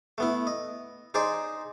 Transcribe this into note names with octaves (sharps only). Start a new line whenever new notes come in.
A3 B3 E4
D#5
D#4 G#4 C5 D5 D#5